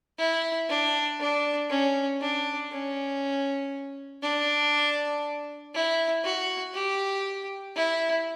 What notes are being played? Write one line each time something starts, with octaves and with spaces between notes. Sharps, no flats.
E4
D4
D4
C#4
D4
C#4
D4
E4
F#4
G4
E4